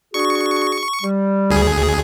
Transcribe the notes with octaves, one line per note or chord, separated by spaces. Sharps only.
D4 F#4 G#4 C#6
G3
D2 G#4